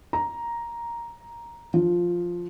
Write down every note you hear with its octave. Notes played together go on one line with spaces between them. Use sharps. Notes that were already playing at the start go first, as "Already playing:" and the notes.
A#5
F3